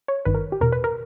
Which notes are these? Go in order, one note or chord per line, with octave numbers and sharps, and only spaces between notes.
C#5
G1 G2 D#3 B4
A#4
G4
E2 B2 A#4
B4
A#4